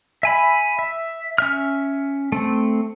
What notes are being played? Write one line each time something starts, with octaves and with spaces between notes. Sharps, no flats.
E5 G#5 B5
E5
C#4 E5 F6
A3 C4